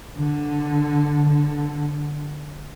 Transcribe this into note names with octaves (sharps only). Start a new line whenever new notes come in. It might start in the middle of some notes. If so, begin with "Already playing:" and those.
D3
D3